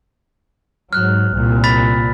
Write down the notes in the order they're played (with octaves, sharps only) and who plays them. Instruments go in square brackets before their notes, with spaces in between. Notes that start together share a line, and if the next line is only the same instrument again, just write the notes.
[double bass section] G#2 F#3 [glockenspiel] F6 F#6
[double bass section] C2 A#2
[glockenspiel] B5 A6 B6